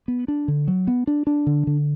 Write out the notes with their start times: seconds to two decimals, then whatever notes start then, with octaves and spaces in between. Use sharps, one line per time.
0.08 B3
0.28 D4
0.48 D3
0.68 F#3
0.87 B3
1.07 D4
1.27 D4
1.47 D3
1.67 D3